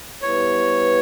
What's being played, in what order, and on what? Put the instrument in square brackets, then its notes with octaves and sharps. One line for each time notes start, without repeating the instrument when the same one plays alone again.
[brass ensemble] G3 B3 E4 G4 B4 [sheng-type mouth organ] C#5